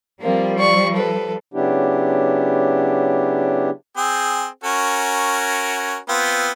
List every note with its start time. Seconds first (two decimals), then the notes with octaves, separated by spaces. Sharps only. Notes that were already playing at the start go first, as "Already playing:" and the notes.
0.21 F3 G3 A#3 C4
0.58 D5 C#6
0.94 A4 B4
1.54 C#3 F#3 B3 D4 E4 G4
3.97 C4 G#4
4.64 C#4 F#4 A#4
6.09 B3 C4 F4